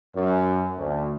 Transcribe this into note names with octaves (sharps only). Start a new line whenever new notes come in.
F#2
D2